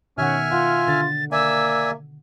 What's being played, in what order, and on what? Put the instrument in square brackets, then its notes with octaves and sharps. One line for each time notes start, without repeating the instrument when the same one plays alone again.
[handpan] B2 D#3 F#5 [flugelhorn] C#4 [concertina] E5 G#5 F6
[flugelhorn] F4 [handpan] F#5
[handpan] D3 [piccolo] A6
[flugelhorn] A#3 [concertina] D5 E5 G#5 [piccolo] E6